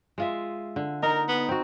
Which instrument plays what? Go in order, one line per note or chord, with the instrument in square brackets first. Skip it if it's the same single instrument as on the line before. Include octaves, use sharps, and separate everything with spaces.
[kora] G#3 F4 E5
D3
[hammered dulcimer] D#4 [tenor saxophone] A#4
[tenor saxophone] B3
[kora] C4 F#4